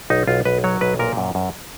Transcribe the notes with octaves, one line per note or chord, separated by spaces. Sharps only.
B1 D#4
B1 F4
B1 B4
F#3 C#5
B1 B4
A#2 A#4
F#2
F#2